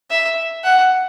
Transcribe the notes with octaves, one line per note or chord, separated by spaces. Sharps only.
E5
F#5